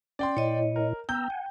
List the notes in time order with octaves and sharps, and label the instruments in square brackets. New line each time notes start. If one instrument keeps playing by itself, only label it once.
[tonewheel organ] C#4 [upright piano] D5 G5 C6
[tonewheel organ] A#2 E4 [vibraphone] C#5 D#5
[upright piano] A#4
[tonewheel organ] B3 A#5 E6 [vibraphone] G5 [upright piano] G6
[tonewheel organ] F#5 G#5